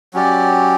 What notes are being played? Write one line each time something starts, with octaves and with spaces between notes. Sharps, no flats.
F#3 C#4 G4 D5